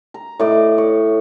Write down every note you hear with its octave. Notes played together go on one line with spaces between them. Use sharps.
A#5
A2 D5 D#5
C#5